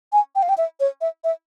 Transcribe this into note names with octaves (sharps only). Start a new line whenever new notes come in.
G#5
G5
F5
G5
E5
C#5
E5
E5